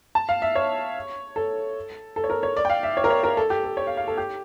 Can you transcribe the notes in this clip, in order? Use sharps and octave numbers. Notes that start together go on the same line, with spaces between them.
A5
F5
E5
C#5
A4
A4
C#5
A#4
C#5
D5
G5
F5
E5
C#5
A#4
C#5
A#4
A4
G4
A4
C#5
F5
F5
A4
G4